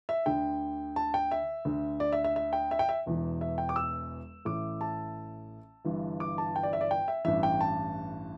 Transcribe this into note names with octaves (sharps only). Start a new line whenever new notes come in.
E5
D2 D3 G5
A5
G5
E5
D2 D3
D5
E5
E5
E5
G5
E5
G5
E5
E1 E2 E3
E5
G5
D6
E6
A1 A2 E3 D6
A5
G1 G2 E3
D6
A5
G5
D5
E5
D5
G5
E5
A1 G2 E3 E5
G5
A5